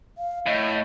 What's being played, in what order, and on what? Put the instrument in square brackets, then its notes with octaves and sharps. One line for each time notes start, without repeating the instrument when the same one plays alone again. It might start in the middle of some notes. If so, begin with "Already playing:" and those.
[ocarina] F5
[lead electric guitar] A2 [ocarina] D#5